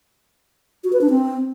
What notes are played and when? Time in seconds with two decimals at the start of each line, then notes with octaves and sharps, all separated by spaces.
0.84 F#4
0.93 B4
1.01 D4
1.10 C4